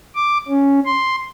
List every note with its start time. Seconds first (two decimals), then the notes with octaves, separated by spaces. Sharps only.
0.15 D6
0.48 C#4
0.85 C6